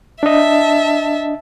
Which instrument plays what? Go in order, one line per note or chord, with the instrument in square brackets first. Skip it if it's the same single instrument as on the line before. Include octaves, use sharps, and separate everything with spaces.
[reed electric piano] D4 D#5 [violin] E5 A5